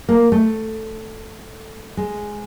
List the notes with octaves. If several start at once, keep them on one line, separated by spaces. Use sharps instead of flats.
A#3
A3
G#3